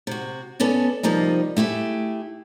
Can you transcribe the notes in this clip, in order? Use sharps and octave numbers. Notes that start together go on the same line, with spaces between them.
C3 F#4
B3 C#4 A4 D5
C3 F3 G3 A#3 D#4
A3 E4 G4 G#4